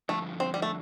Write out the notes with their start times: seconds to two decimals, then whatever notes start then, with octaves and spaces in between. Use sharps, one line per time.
0.09 G2 D3 F3 A3
0.40 C4
0.54 G3
0.62 A3